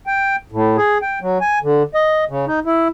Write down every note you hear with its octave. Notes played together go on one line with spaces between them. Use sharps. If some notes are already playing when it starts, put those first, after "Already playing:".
G5
A2
G#4
G5
F#3
G#5
D3
D#5
C#3
D#4
E4